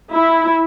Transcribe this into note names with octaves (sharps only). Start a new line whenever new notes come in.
E4